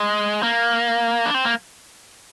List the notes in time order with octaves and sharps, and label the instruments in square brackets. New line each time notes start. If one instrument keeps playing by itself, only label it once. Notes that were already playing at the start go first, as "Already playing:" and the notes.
Already playing: [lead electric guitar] G#3
A#3
D4
C4
A#3